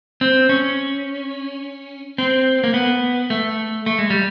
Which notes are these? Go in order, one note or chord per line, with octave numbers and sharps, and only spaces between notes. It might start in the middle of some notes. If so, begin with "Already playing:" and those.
C4
C#4
C4
A#3
B3
A3
A3
G#3
G3